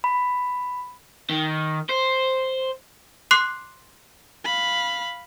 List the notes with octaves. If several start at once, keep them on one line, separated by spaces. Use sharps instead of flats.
B5
D#3
C5
C6 D6 F#6 C7
F5 B5